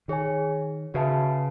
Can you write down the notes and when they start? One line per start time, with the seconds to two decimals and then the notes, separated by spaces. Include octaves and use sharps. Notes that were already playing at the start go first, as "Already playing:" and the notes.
0.08 D#3 G#4 C#5 G#5
0.94 C#3 F#4 B4 E5 A5